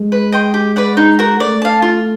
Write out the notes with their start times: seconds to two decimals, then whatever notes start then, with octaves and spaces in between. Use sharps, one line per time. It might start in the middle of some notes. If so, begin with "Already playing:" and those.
Already playing: G#3
0.12 B4
0.32 D#5 G5 C6
0.54 G4
0.76 B4 D5 F#5
0.97 D#4
1.19 F#4 A#4
1.39 A3 D5
1.62 F5 A5
1.82 F4